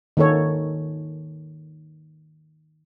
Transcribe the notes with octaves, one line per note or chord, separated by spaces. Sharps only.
D#3 A#3 A4 C#5